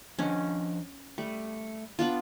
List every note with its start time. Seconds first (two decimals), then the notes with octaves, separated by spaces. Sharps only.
0.19 F3 C#4 D4 D#5
1.18 G3 A3
1.99 B3 D4 F4